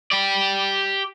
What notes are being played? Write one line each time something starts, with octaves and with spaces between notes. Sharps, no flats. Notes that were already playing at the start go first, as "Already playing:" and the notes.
G4 D5